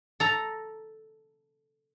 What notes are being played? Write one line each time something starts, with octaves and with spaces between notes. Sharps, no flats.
A4 A#5